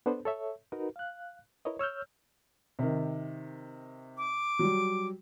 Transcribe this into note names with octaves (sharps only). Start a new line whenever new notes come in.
B3 D4 A4 B4 C5
A4 C#5 E5
D#4 F#4 A#4 B4
F5 F#6
E4 A#4 B4 C#5 D#5
C#5 E6 F6 G6
C3 D#3
D6
F#3 G3